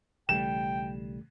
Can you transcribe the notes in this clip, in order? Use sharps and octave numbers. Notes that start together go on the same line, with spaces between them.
B1 C#3 E3 G3 A3 G5 E7